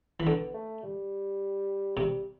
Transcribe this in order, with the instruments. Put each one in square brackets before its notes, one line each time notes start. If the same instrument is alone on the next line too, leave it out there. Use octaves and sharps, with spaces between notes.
[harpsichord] E3
[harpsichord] D3 [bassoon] B3
[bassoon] A3
G3
[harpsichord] C3 [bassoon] G3